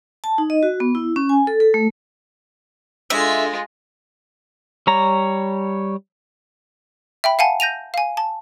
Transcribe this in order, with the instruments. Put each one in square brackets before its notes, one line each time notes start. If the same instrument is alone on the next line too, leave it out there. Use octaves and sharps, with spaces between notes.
[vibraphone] A5
D#4
D#5
F#4
B3
E4
C#4
G#5
A4
A4
A3
[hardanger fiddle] G#3 F4 [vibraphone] D4 G#4 A4 [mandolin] E5
[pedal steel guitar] G3 C#5 A#5
[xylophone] E5 G5 B5
F5 F#5 G#5 A5
G6 A#6 D#7 F7
F5 G#5
A5